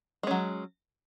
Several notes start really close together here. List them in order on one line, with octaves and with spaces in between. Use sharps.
G#3 C#4 F#3